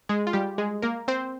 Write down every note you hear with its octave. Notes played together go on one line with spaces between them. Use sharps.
G#3 G#4
F4
G3 G4
G#3 G#4
A#3 A#4
C4 C5